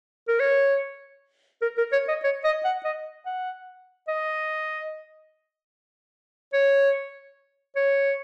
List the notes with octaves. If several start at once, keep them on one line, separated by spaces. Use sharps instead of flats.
A#4
C#5
A#4
A#4
C#5
D#5
C#5
D#5
F#5
D#5
F#5
D#5
C#5
C#5